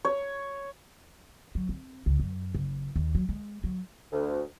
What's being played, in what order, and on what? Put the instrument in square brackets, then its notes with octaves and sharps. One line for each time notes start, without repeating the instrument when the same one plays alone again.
[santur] C#5
[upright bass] F#3
C4
C#2
F#2
F#1
D#2
F#3
G#3
F#3
[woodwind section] D2